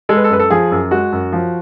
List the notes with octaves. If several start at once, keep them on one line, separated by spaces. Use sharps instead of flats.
G#3 A4
B4
A4
F#2 B4
A4
F3 G#4
F#2
G#3 F#4
F#2
F3